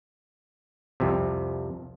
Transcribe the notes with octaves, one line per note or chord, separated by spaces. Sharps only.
C2 F2 C3